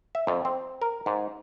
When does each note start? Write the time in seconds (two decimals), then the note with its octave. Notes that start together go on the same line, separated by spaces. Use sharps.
0.15 E5
0.27 F2
0.45 C4
0.82 A#4
1.06 G#2